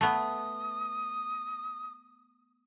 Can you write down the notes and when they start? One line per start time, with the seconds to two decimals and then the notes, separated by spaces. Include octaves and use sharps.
0.01 A3 B3 D#6